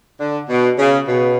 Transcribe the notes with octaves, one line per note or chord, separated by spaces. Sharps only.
D3
B2
C#3
B2